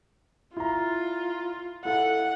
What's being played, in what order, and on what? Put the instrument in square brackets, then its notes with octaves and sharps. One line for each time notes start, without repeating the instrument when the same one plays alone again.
[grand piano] E4 A#5 [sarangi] F4
[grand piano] E4 A4 F5 [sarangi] F#5